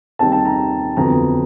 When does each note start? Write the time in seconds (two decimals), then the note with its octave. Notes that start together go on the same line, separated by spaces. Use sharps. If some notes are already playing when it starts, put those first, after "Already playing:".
0.19 D#2 D#3 G3 C4 D#4 A5
0.32 A5
0.45 A#5
0.97 F2 D3 F#3 B3 A#5